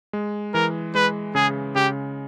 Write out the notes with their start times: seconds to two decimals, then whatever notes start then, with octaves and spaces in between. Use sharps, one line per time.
0.13 G#3
0.54 E3 A#4
0.95 G#3 B4
1.35 C#3 G#4
1.75 C#3 G4